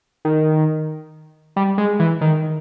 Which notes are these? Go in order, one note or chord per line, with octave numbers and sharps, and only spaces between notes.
D#3
G3
G#3
E3
D#3